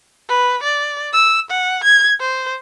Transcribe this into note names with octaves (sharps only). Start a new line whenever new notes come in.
B4
D5
E6
F#5
G#6
C5